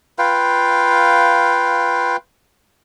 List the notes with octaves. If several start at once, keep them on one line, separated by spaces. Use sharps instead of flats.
F4 B4 F5 G5